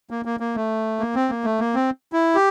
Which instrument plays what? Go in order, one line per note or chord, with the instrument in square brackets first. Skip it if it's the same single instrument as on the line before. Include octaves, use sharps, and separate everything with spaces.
[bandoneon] A#3
A#3
A#3
A3
A#3
C4
A#3
A3
A#3
C4
E4
G4